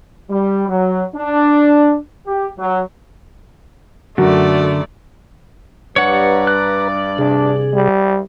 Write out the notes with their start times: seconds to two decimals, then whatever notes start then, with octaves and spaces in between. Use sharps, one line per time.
0.29 G3
0.69 F#3
1.16 D4
2.27 G4
2.59 F#3
4.18 F#2 D3 A3 F#4 D5
5.96 G2 B4 C#5 D5 F#5 A#5
6.47 F#6
7.18 C3 D4 G#4
7.73 G3